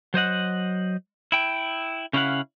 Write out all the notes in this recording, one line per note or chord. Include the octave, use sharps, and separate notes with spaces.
F#3 C5 D#5 F#5
E4 G5
C#3 C#4 E4 C#5 F5 F#5